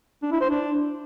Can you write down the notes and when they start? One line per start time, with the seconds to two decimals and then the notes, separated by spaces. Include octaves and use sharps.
0.23 D4
0.32 E4
0.41 C5
0.50 D4